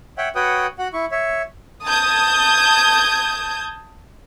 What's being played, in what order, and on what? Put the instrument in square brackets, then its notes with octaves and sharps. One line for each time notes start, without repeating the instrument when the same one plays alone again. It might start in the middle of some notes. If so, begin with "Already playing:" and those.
[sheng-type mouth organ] C#5 E5 F#5 G5
F#4 B4 C#5 F#5 G5 D#6
F#4 F#5
E4 C#6
C#5 E5
[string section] A5 D#6 G6 G#6